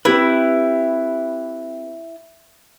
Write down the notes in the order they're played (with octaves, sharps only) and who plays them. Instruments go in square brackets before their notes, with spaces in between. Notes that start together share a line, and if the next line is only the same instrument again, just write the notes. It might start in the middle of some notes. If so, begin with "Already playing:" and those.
[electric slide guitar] C4 G4 B4 [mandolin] E4